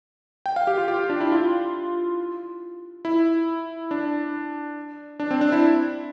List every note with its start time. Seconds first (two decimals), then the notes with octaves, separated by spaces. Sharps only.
0.46 G5
0.56 F5
0.67 G4
0.78 F4
0.88 G4
0.99 F4
1.10 D4
1.21 E4
1.32 F4
3.05 E4
3.91 D4
5.20 D4
5.31 C4
5.41 D4
5.52 E4